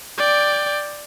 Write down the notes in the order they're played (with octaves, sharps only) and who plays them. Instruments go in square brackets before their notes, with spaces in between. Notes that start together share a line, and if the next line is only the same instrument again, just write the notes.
[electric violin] D5 G5